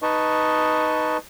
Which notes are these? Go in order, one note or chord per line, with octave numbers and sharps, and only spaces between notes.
D#4 B4 D#5 A5 C#6